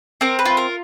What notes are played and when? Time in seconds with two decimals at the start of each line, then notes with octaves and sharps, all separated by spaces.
0.21 C4 A#4
0.39 B4
0.45 F4
0.57 A#4